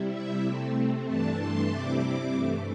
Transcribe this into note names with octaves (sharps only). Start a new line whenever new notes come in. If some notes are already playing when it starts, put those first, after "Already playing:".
Already playing: C3 G3 E4
E5
C3 A3 C4
G2 E3 A3 D4 A5
C6
C3 G3 C4 E4 D6
G2 E3 A3